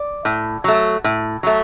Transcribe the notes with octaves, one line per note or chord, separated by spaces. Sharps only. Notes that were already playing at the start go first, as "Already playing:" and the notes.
Already playing: D5
A2
F#3 A3
A2
F#3 A3